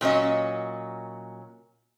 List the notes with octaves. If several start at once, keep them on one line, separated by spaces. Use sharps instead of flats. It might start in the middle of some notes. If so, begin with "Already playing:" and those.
A#2 F#3 C#4 D#5